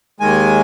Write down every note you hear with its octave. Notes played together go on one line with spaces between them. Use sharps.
D#2 D#3 G#3 G#5